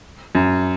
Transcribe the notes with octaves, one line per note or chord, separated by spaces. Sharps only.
F#2